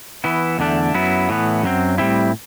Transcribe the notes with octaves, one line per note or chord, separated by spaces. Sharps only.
E3 B3 E4
E2 D3 A3 D4
F#2 F#3 B3 E4
A2 E3 B3
F#2 F#3 C4
A2 G3 C4 E4